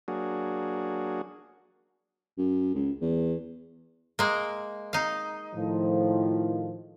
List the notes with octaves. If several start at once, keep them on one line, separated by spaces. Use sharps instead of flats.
F#3 A#3 D4 F#4 G#4
F#2
C#2
E2
G#3 A#3
D#4 F5
A2 D#3 F3